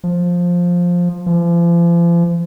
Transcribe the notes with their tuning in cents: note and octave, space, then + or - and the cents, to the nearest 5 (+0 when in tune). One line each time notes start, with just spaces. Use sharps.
F3 +10
F3 -40